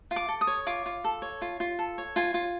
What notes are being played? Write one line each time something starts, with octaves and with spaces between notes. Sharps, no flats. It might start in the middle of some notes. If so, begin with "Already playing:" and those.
F4
D6
A4
D#6
C#5
F4 D6
F4
A4
C#5
F4
F4
A4
C#5
F4 G#5
F4